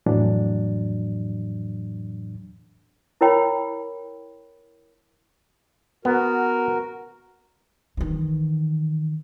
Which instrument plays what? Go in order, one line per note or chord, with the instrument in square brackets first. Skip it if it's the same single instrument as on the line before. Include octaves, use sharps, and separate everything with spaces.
[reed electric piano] F2 A2 E3 F#3 D4
[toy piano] E4 A#4 C#5 G5 B5
[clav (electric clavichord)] B3 [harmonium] F#4 A#4
[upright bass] D#3 E3